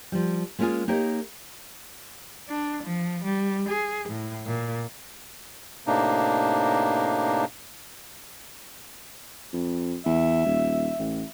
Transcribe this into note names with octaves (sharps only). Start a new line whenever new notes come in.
F3 G3
G#3 A#3 C#4 D4 F4 G#4
A#3 D#4 G4 A#4 C#5 D#5
D4
F3
G3
G#4
A2
A#2
A2 C3 A#3 D4 D#4
F2
E2 E5
D#1
A1